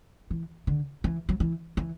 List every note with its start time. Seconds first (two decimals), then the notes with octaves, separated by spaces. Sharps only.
0.30 E3
0.67 D3
1.04 E3
1.29 F#3
1.40 E3
1.77 E3